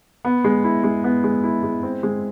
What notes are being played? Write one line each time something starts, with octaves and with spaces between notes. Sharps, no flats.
B3
G#3
E4
G#3
B3
G#3
E4
G#3
C4
G#3